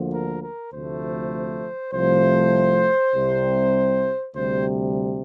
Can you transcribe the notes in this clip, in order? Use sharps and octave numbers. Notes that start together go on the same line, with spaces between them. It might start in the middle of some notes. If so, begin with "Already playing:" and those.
Already playing: D2 D3 F3 A#3
A#4
A#4
D2 C3 F3 A3 C5
C2 C3 F3 A3 C5
C2 C3 G3
D2 C3 G3 C5